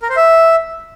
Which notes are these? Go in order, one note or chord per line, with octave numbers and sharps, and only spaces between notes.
A#4
C5
E5